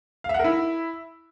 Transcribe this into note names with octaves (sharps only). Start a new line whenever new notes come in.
F5
E5
F#5
A#4
E4